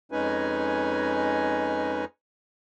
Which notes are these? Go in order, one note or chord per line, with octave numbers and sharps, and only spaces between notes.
F2 G#3 C#4 D#4 B4 G#5